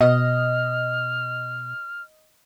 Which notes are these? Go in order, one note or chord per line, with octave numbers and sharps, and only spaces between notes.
B2 D#5 F6